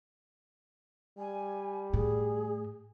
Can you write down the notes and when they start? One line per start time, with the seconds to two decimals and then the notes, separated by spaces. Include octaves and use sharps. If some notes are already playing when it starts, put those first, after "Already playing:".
1.18 G3 G#5
1.93 A2 G#4